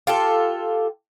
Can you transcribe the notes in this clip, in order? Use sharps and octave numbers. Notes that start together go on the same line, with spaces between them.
F4 G4 A4